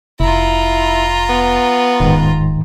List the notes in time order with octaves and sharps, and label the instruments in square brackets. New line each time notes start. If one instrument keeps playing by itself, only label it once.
[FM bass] F1 [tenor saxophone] E4 [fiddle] F4 A#5
[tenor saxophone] B3
[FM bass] D#1 [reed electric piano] G#2 D#3